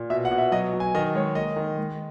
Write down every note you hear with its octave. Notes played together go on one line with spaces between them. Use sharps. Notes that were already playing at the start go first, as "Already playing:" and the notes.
Already playing: A#2
B2 E5
F#5
B2
E5
F#3 D#5
F#3
G#5
D#3 D#5
G#3 C#5
A#3 D#5
D#3
G#3